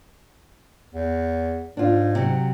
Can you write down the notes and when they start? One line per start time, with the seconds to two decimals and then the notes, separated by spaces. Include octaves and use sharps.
0.94 E2
1.77 G#2 D4 F4
2.15 C3 F#3